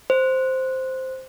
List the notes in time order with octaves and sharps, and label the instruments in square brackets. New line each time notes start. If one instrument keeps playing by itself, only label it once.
[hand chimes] C5